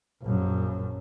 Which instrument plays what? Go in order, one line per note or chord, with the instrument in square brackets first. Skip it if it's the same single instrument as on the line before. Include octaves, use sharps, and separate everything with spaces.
[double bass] A#1 F#2